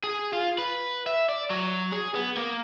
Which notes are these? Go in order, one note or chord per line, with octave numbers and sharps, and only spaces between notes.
G#4
F4
B4
E5
D5
F#3
G#4
B3
A#3